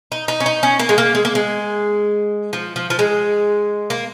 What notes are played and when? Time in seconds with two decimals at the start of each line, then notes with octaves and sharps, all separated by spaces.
0.12 D#4
0.28 D#4
0.40 C#4
0.46 D#4
0.63 C#4
0.79 A#3
0.89 G#3
0.98 A#3
1.15 G#3
1.25 A#3
1.35 G#3
2.53 F3
2.76 F3
2.90 F3
2.99 G#3
3.90 A#3